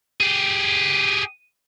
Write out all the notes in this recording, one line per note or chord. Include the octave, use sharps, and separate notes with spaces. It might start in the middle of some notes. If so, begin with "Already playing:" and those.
G4 G#4